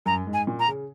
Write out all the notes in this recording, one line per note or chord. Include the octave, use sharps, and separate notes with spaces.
F#2 A#5
G#2
G#5
A#2
A#5
C#3